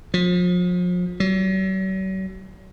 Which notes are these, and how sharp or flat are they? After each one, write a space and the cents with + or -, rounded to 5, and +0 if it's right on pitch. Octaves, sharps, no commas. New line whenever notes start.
F3 +35
F#3 +45